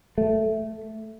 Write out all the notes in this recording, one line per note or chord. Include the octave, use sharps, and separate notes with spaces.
A3